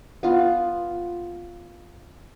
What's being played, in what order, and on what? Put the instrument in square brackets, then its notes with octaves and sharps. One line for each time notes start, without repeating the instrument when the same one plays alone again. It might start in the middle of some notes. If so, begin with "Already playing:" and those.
[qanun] B3 F4